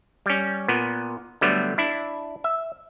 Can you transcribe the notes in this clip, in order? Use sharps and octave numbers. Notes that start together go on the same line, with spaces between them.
G3 C#4
A#2 B3
D3 F#3 G3 A3 B3
D4 E4
E5